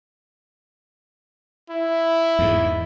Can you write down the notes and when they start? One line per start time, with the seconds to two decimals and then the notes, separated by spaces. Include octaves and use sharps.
1.70 E4
2.39 E2 G#2